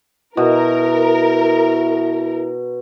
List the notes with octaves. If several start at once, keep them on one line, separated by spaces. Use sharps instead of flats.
B2 E4 A#4